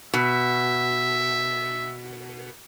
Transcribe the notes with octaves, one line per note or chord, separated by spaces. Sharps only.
B2 E5